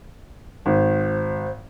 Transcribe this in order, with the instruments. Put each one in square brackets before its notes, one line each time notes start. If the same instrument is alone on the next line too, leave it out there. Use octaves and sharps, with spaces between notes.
[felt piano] G#1 [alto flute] C5